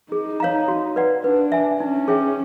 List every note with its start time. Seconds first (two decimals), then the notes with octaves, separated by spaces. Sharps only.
0.12 D#4 G#4
0.40 C#5 F5 A#5
0.68 F#4
0.96 B4 D5 F#5
1.24 D4 B4
1.52 E5 G#5
1.80 C#4 D#4
2.08 G#4 C#5 E5 G5